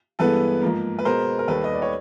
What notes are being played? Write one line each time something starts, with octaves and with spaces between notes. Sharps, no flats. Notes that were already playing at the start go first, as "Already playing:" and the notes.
G2 E3 G#3 B3 A4 B4
G#2 F3 A#3
B4
B2 G#3 B3 A#4 C5
A#4
D#2 D#3 G3 A4 B4
D#5
D5
C#5